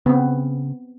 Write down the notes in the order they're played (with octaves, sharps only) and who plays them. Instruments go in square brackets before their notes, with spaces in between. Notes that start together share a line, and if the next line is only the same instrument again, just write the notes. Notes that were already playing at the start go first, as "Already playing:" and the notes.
[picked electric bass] C#3 [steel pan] B3 C4